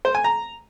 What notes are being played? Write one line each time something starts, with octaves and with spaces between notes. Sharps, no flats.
C5
G#5
A#5